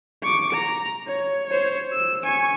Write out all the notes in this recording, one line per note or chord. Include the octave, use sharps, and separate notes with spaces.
C#6 D6
A#5
C#5
C5 C#5
E6
G#5 C#6